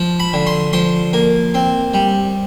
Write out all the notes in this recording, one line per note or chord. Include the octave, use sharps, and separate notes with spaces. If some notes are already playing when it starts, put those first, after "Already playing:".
Already playing: F3
B5
D3
C6
F3 C6
A#3
C4
G3